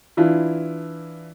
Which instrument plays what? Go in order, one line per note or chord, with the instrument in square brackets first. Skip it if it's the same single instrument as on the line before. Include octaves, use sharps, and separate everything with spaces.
[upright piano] E3 D4 E4 F4